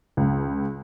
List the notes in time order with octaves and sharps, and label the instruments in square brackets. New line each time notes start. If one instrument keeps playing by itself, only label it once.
[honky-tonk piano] C#2